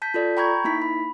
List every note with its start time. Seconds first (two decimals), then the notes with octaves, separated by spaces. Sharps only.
0.02 A5 G6 B6
0.14 F4 A4 D5
0.37 G5 A#5 B5 C#6 G6 G#6
0.64 A#3 D#4 E4 B6
0.82 B5